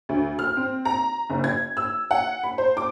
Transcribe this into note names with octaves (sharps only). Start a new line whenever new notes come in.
D2
F6
C4
A#5
F#1
G#6
E6
F#5
B5
C5
D6